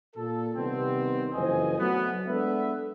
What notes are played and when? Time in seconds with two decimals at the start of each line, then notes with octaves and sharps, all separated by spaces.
0.16 A#2 A4
0.56 C3 D#3 G3 B3 C4
1.34 F#1 F2 E3 C5 D#5 G#5
1.79 F#3 A3 B3
2.27 G#3 B3 D4 A4 B4 E5